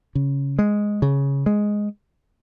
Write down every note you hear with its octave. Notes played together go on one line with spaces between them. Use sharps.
C#3
G#3
C#3
G#3